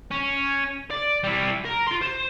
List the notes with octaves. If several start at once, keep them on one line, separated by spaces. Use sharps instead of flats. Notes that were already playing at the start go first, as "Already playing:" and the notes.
C#4
D5
G3 E4
A#4
F4 C6
C5